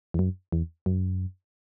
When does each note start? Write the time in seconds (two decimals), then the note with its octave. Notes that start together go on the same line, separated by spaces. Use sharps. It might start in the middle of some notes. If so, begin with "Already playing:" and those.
0.14 E2
0.19 F#2
0.52 E2
0.86 F#2